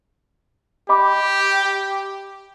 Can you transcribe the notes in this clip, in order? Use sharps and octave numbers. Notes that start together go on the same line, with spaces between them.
G4 D#5 B5 D6